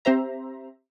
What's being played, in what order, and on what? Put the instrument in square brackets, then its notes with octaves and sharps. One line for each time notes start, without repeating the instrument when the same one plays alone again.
[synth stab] C4 G4 C5 E5 A#5